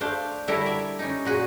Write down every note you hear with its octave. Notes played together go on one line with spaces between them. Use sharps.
A3 D4 C5 F5
D3 G3 E4 A4 A#4 C#5
D5 E5
C#4 D#4
A#2 F#4 G#4